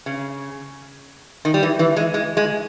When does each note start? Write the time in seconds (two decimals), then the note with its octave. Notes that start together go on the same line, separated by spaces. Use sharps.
0.06 C#3
1.45 D#3
1.54 G3
1.63 E3
1.79 E3
1.96 G#3
2.14 G#3
2.37 G#3